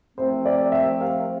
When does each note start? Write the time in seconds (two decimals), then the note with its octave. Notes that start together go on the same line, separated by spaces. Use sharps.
0.17 C2 C3 F3 A3 C4 C5
0.46 D5
0.72 E5
1.01 F5